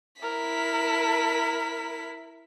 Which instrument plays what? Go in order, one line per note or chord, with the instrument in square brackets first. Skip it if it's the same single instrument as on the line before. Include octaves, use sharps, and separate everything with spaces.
[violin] E4 B6 [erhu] A#4